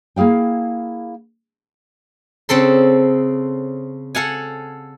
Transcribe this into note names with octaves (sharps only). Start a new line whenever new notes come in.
A#3 E4 G#4 F5 G5
C#3 C4 A4 C6
A4 F5 F#5 G#5